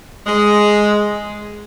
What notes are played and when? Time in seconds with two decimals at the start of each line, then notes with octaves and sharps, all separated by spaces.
0.27 G#3